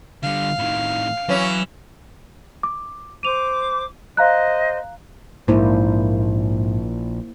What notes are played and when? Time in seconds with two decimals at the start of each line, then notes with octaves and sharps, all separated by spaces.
0.23 D3 G3 F5
0.59 A2 D#3
1.29 E3 F#3 C#4
2.63 D6
3.23 C5 D6 D#7 F7
4.17 C5 D#5 F5 A#5 F#6
5.48 A#1 G#2 A#3 E4 C5